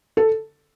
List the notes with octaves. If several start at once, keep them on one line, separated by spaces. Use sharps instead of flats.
A4